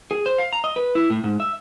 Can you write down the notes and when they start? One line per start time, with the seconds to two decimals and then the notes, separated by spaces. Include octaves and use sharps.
0.11 G#4
0.26 C5
0.38 F5
0.53 A#5
0.64 D#5
0.76 B4
0.95 E4
1.10 A2
1.24 G#2
1.40 E5